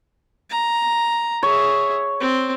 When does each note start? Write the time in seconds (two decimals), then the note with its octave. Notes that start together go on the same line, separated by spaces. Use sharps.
0.50 A#5
1.43 G#4 C#5 E5
2.21 C4